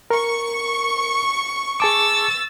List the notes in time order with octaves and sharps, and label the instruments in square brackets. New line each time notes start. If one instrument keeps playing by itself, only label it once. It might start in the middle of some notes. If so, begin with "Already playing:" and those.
[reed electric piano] A#4 [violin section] C#6
[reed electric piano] G#4 A5 D6 [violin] E6 A6